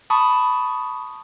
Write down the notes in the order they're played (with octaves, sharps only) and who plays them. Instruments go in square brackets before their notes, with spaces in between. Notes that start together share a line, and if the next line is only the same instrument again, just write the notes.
[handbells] A5 B5 C#6 D#6